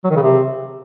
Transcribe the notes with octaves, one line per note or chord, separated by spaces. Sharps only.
F#3
D#3
C#3
C3